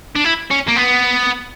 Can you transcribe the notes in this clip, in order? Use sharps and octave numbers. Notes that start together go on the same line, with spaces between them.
D4
E4
C#4
A#3
B3